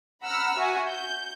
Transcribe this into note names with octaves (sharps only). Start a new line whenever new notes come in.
F#5 A#5 B5 E6 F6
F#4 E5 G#5
G6